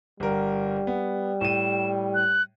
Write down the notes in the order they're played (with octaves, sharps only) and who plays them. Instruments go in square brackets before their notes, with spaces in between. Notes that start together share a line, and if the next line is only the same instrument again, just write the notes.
[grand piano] G1 A#4 [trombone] G3
[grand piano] B3
[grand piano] A2 D#7 [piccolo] E7
[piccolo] F#6